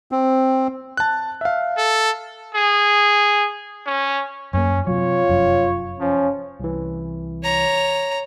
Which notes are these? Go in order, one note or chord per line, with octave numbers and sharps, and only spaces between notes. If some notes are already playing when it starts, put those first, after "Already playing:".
C4
A5 F#6
E5 F5
A4
G#4
C#4
F#2 A#3 C#4
C3 F#3 F4 C#5
F1 F#2
F3 C#4
C2 E3
C#5 A#5